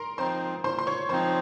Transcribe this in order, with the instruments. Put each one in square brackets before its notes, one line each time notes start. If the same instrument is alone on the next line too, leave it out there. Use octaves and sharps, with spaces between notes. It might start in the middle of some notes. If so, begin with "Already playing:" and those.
Already playing: [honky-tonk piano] A#4 A#5 C6
[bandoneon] F3 C4 D#4 [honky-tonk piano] C5 C6
[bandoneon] A#2 [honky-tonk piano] C5 C6
[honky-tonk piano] C6
C#5 C#6
[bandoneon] F3 C4 D#4 [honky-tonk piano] C5 C6